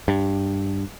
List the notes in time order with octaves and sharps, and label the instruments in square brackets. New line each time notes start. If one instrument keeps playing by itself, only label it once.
[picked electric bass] G2